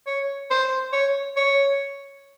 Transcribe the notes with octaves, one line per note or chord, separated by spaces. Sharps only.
C#5
C5
C#5
C#5